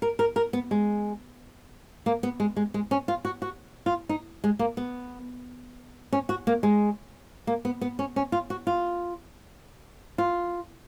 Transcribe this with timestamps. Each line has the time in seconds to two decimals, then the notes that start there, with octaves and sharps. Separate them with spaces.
0.02 A#4
0.19 A#4
0.36 A#4
0.53 B3
0.71 G#3
2.06 A#3
2.23 B3
2.40 G#3
2.56 G#3
2.74 G#3
2.91 C#4
3.08 F4
3.25 F#4
3.42 F#4
3.86 F4
4.09 D#4
4.44 G#3
4.59 A#3
4.77 B3
6.13 C#4
6.29 F#4
6.47 A#3
6.63 G#3
7.47 A#3
7.65 B3
7.81 B3
7.99 C#4
8.16 C#4
8.32 F4
8.50 F#4
8.67 F4
10.18 F4